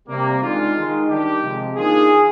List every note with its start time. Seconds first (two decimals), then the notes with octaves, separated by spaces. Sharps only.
0.08 C3 G3 A#3
0.42 D#3 G#3 D4 F4
0.76 D#3 G#3 D#4
1.09 D#3 G3 D4 G4
1.43 C3 F3 G#3
1.76 D#3 A#3 D4 F4 G#4